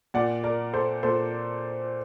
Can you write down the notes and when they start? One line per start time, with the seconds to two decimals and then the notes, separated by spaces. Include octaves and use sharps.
0.14 A#2 D5 F#5
0.43 A#4 D5
0.73 A4 C5
1.03 A#2 A4 C5